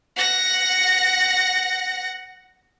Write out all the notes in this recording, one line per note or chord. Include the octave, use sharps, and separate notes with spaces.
F#5 A#6